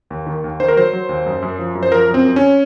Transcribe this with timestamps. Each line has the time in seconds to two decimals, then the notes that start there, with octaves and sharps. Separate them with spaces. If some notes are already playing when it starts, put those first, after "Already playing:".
0.10 D#2
0.26 D#3
0.44 D#2
0.60 D#3 C5
0.68 A#4
0.77 F#3 C5
0.93 F#3
1.09 D#2
1.26 F#2
1.42 F#2
1.59 F3
1.75 F#2
1.83 C5
1.91 F3 A#4
2.08 F#2
2.14 C4
2.25 F#2
2.36 C#4